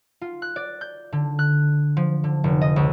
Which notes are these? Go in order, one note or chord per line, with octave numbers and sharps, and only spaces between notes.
F4
F#6
D5
G6
D3
F#6
F3
D3
F1
D#5
C#2